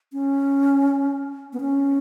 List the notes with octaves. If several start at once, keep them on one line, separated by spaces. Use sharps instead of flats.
C#4
B3
C#4